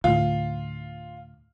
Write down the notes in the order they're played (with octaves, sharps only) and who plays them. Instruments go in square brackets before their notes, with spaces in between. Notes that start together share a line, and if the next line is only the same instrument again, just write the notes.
[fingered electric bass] D2 A2 [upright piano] F4